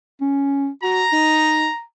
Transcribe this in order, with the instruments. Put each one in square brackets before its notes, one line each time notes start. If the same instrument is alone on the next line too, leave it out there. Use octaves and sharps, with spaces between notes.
[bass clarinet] C#4
[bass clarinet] F#4 [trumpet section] A#5
[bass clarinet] D#4